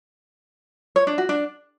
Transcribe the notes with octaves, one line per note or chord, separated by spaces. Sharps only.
C#5
D4
F#4
D4